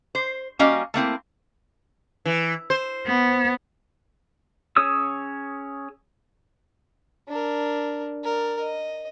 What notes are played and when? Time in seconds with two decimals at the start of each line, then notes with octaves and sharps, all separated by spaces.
0.15 C5
0.59 G3 A#3 C#4 F#4 D#5 F5
0.94 A3 A#3 C4 E4
2.25 E3
2.70 C5
3.06 B3
4.76 C#4 G#4 C#5 D#6 E6
7.28 D4 A#4
8.24 A#4 D5
8.60 D#5